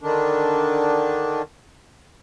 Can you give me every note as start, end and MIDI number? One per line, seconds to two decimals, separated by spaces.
0.03 1.42 50
0.03 1.42 51
0.03 1.42 62